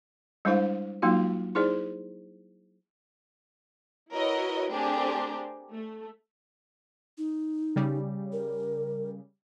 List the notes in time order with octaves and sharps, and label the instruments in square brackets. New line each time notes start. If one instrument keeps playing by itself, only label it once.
[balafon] G3 G#3 D4 E4 C5 F5
F#3 G#3 A#3 D#4 F4 F#4
D#4 E4 G#4 C5 D5
[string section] E4 F#4 A#4 B4 C#5 D#5
A3 C4 D4 G4 G#4 A#4
A3
[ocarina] D#4
[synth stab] C#3 G3
[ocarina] A#4